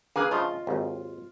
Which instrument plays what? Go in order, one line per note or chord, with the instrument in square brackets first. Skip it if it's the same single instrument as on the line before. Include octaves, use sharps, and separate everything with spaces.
[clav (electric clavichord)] A#3 [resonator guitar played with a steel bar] G#4 B4 G#5
[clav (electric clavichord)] C#3 F3 A3 [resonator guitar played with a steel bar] F4 D#5
[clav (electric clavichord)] G#1 D#2